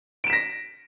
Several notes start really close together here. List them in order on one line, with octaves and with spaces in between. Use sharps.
D7 E7 B6 A#6